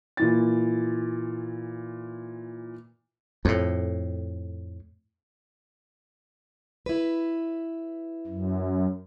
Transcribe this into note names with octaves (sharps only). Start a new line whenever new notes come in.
A#2 E3 A6
F2 A2
E4 B4
F#2